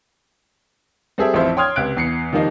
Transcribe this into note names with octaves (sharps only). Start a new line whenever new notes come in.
G3 C4 G#4 A4 E5
A1 F2 F3 E4 C5 E5
C#5 G5 C6 D#6 F6 G#6
C#2 C3 F#6 D7
E2 C7 C#7
D#3 F3 G3 A#3 D#4